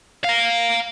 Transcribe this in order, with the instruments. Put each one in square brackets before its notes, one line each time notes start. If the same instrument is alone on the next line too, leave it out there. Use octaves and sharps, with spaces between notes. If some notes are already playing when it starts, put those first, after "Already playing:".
[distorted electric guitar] F5 A#5